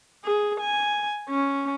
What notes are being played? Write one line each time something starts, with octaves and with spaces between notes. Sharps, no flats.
G#4
G#5
C#4